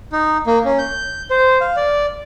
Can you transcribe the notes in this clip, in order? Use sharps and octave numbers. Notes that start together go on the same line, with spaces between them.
D#4
A#3
C#4
G6
C5
F5
D5